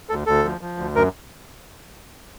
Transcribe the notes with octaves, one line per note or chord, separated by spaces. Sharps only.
D2 A4
D2 A4
F3
F3
D2
F#2 A#4